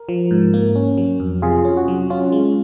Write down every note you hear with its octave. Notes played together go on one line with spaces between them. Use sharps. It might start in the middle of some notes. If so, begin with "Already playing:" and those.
Already playing: A#4
F3
G#2
A#3
C#4
F#3
F2
C3 F4 G#4
C#4
F#4
F#3
C#4 F4
G#3